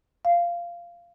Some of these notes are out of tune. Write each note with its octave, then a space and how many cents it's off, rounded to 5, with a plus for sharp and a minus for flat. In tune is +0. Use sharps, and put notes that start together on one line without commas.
F5 -15